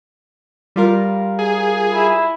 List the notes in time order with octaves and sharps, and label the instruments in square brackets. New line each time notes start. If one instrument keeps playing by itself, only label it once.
[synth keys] G3 F4 A#4
[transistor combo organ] G#4
[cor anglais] E4